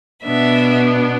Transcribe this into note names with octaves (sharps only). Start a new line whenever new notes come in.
B2 B3 D4 E5